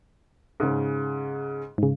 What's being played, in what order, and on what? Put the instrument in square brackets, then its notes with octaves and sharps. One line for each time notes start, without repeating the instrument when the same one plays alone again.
[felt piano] G#2 C#3
[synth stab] G#2 C#3